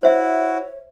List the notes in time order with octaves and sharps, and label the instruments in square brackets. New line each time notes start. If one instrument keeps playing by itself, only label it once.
[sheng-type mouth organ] E4 F#4 [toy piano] C5 E5 [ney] C#5